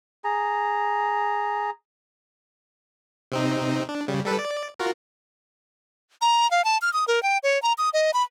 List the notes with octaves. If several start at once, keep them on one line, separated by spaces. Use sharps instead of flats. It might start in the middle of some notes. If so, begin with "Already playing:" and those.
G#4 A#5
C3 C4 D#4
D4
C#3 G3
G3 A4 B4
D5
F4 F#4 A#4
A#5
F5
A5
F6
D#6
A#4
G5
C#5
A#5
D#6
D#5
B5